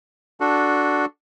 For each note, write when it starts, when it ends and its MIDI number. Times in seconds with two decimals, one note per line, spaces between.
0.40 1.05 62
0.40 1.05 66
0.40 1.05 69